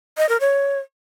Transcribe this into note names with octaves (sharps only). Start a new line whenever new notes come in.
D#5
A#4
C#5